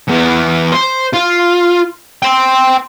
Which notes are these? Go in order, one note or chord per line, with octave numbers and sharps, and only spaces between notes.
E2 B3
C5
F4
G5 C6